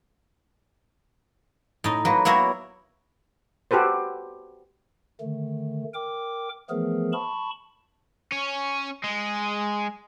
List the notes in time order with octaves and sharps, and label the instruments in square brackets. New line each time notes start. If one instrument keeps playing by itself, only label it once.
[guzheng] A2 D#4
F#3 A#3 B4
F#3 A#3 B3 E4 A#4 C#5
[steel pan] F#4 G4 A4 B4 C5
[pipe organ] D3 D#3 A3
A#4 G5 D6
E3 F3 A3 B3 G#4 A#4
A5 B5 C#6
[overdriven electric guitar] C#4
G#3